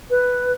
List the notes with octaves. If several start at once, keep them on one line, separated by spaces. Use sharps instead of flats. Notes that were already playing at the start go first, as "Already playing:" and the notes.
B4